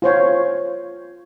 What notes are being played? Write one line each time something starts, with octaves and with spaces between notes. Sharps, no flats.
F4 C5 C#5